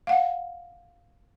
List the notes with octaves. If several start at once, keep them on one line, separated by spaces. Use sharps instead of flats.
F5 F#5